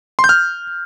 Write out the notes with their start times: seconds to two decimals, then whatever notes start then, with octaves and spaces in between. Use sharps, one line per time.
0.19 C6
0.24 G6
0.29 F6